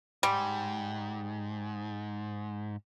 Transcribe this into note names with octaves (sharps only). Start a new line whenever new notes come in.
G#2 G3